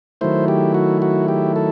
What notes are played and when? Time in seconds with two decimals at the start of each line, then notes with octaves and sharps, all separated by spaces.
0.21 D#3 F#3 A3 E4 C5
0.48 G4
0.74 F#4
1.02 F#4
1.28 G4
1.56 A4